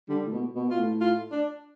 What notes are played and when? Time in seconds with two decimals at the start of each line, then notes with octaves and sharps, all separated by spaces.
0.08 D3 G3
0.26 A2
0.32 B2
0.55 B2
0.68 B2 F4
0.78 A2
1.01 F4
1.32 D4